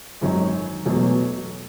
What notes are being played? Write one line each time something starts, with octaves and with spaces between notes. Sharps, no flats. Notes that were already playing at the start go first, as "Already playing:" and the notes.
G#1 F#2 D#3 F#3
E1 E2 B2 F#3 A3